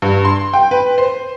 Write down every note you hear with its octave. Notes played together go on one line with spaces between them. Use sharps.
G2
C6
G5
B4
C5